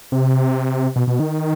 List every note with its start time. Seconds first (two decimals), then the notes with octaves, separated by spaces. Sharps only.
0.12 C3
0.96 B2
1.07 B2
1.20 D#3